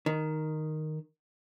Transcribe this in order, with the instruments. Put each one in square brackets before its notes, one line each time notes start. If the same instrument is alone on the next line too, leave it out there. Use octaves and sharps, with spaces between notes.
[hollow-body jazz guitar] D#3